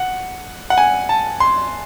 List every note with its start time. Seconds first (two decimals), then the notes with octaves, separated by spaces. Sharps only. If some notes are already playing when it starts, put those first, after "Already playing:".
Already playing: F#5
0.70 F#5
0.78 G#5
1.09 A5
1.40 C6